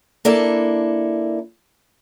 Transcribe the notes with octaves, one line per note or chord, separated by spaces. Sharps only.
A#3 D4 E4 A4